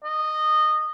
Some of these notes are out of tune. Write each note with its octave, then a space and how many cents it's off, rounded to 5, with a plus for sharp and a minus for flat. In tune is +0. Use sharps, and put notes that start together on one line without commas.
D#5 -15